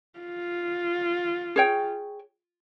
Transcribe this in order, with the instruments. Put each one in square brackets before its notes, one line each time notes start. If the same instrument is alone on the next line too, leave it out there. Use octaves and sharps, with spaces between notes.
[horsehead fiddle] F4
[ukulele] G#4 C#5 G5